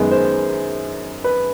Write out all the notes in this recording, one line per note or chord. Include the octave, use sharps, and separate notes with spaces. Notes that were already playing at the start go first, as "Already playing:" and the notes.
Already playing: F#2 D#3 G#3 B3
C5
B4